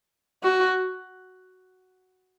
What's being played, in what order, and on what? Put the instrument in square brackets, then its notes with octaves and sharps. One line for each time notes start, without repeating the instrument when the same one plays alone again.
[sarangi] F#4